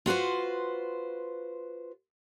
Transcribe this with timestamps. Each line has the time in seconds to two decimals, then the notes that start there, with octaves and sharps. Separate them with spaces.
0.06 F4 F#4 B4 C5